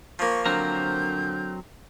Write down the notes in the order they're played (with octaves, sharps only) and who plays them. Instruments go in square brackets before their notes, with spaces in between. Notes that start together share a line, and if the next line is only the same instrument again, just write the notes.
[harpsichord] F3 A#3 [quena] C#6
[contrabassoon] D3 [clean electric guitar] F#3 C4 A#4 [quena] G6